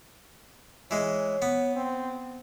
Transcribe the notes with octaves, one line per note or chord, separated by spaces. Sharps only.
E3 G#3 C#5
B3
C4